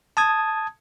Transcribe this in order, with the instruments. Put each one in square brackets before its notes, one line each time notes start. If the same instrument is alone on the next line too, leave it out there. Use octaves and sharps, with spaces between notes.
[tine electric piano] A5 D#6 G#6